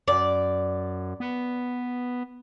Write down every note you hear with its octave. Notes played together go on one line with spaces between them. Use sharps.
F#2 D5
B3